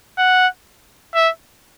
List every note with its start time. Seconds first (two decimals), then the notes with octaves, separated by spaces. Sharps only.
0.18 F#5
1.15 E5